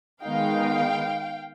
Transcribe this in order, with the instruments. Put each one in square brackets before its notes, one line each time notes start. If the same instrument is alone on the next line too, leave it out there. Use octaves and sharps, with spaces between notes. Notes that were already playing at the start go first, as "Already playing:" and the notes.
[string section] D#3 G#3 B3 D#4 F5 G5